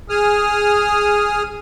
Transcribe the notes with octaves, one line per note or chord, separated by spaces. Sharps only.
G#4 D#6 F6